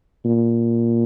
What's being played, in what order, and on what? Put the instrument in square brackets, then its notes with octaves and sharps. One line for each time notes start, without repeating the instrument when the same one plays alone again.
[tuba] A#2